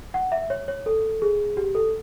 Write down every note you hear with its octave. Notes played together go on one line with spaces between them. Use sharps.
F#5
E5
C#5
C#5
A4
G#4
G4
A4